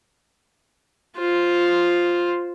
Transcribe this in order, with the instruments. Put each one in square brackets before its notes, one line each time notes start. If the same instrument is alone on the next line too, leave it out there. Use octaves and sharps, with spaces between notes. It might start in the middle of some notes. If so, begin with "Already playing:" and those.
[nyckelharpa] F4 C5